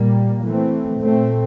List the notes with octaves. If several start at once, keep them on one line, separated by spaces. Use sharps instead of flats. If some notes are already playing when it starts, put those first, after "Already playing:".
Already playing: A#2 G3 A#3
E3 A3 C4
A#2 A3 C4